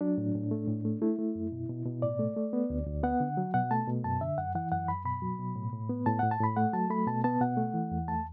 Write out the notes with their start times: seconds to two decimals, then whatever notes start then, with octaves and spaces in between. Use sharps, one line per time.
0.01 F#3 D4
0.18 A2
0.35 A2
0.51 A3
0.68 A2
0.85 A3
1.02 A3 E4
1.19 A3
1.35 F#2
1.52 B2
1.69 B2
1.86 B2
2.02 A2 D5
2.19 A3
2.36 A3
2.53 B3
2.70 D2
2.87 D2
3.03 B3 F#5
3.20 D3
3.37 F#3
3.54 B2 F#5
3.71 A3 A5
3.88 B2
4.04 F#2 A5
4.21 D3 E5
4.38 F#2 F#5
4.55 E3 F#5
4.71 F#2 F#5
4.88 F#2 B5
5.05 B2 B5
5.22 F#3
5.39 B2
5.56 A2
5.73 A2
5.89 B3
6.06 A2 A5
6.19 A2 F#5
6.31 A5
6.40 A2 B5
6.57 A3 F#5
6.73 F#3 A5
6.90 A3 B5
7.07 B2 A5
7.24 B3 A5
7.41 B2 F#5
7.57 A3
7.74 E3
7.91 E2
8.08 A3 A5